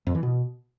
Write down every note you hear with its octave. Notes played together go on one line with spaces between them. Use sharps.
F2
E3
B2